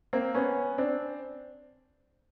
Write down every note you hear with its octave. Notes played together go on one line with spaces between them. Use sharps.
A#3 C4
B3 C#4
C4 D4